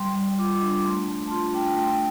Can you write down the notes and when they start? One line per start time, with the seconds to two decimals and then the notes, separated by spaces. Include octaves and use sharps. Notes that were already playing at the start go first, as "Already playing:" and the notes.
Already playing: G3 C6
0.16 G3
0.38 F4 D6
0.54 D6
0.62 D4
0.70 D6
0.85 A3 C6
1.08 A3
1.27 A5
1.31 F4 C6
1.54 D4 G5
1.77 A3 G5